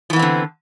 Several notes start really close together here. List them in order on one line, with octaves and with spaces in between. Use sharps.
F3 E3 B3 C4 D3